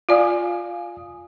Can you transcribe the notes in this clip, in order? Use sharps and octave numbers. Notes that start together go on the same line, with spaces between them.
F4 D5 F5 G#5 D#6